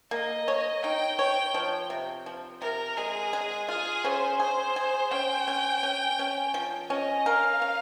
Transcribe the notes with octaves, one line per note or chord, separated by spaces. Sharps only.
A#3 D#5
C#5
D#4 G5
C#5 G5
F3
C3
F3
C3 A#4
G#3 G#4
G#3
F4 G#4
C#4 C5
G#4 C5
G#4
C#4 G5
C#4
C#4
C#4
F3
C#4 D#5
A#4 F5
C#4